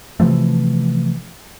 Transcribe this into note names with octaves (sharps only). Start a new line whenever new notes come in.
C3 E3 F3 A3